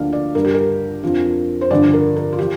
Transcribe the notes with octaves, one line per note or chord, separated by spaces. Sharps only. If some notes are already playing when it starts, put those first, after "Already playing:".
Already playing: D2 D3 F3 A#3 D4 D5 F5
D5
G2 G3 D4 A#4
G4
A#4
F2 F3 D4
C5
G2 D3 F3 D5
A#4
A#4
F4
F3 G4